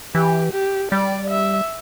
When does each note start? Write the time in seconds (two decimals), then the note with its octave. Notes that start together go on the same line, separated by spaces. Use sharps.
0.15 E3 G4
0.53 G4
0.92 G3 D5
1.30 E5